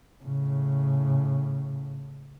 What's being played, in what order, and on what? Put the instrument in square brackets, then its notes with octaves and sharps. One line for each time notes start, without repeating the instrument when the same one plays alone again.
[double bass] A2 C#3